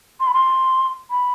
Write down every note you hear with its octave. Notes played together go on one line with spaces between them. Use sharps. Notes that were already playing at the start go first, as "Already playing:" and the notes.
C6
B5
C6
B5